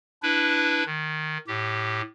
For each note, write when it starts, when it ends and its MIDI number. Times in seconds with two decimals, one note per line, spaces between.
0.23 0.84 62
0.23 0.84 64
0.23 0.84 71
0.86 1.38 51
1.48 2.02 45
1.48 2.02 67